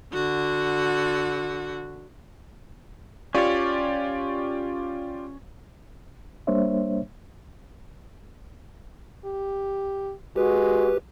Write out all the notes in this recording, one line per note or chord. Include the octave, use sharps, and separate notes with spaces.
D3 F#4
C#4 F4 G4 C#5 D5
G3 A#3 D4 C5 C#5 E5
G4
G#3 F#4 G4 B4